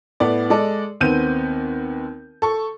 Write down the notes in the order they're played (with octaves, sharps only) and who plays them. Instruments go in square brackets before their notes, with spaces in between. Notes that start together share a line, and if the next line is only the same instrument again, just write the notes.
[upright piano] A2 B3 D5
G#3 A4 D5
D#2 B3 C4 G6 D#7
A4 C#6